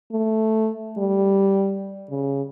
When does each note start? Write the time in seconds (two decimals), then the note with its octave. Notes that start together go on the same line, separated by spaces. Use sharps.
0.12 A3
0.98 G3
2.10 C#3